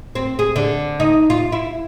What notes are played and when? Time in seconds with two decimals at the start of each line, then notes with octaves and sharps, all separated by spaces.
0.15 C4
0.39 G#4
0.56 D3
1.00 D#4
1.30 F4
1.52 E4